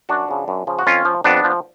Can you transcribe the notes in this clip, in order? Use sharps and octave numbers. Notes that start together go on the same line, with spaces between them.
F#2 D4 F#4
C#3 F3
F#2
C#3 F3
F#4
F2 C#4 F4
F3
F2 B3 D4
F3